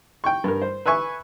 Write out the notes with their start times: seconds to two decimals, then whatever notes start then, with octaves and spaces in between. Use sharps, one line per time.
0.24 G5 C#6
0.44 G2 A#4
0.62 C5
0.86 B4 E5 G#5 C#6